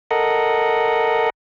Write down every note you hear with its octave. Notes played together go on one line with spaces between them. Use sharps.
A4 A#4 D#5 F#5